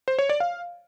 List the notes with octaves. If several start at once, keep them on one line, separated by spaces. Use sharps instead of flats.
C5
C#5
D5
F5